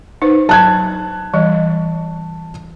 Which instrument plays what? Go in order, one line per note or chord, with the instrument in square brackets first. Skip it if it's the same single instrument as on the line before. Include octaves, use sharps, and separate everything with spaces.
[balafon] D#4 B4 C5
[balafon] F#3 [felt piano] A5 F#6 G#6
[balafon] E3 G3 D#5